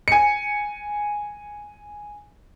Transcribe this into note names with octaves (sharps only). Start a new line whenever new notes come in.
G#5 C#7